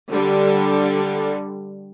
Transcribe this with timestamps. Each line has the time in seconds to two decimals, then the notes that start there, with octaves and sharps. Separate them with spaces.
0.10 D3 G3